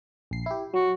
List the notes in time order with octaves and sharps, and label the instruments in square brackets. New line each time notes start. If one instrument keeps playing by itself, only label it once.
[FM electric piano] A#1 C7
E4 G4
[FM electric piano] F#3 [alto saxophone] F#4